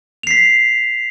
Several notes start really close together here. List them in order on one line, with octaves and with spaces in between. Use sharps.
F7 C7 B6